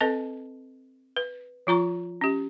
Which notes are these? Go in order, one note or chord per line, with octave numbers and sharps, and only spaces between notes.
C4 A4 B4 D#5 A5
B4
F3 F4 A#5 C#6
C#4 G4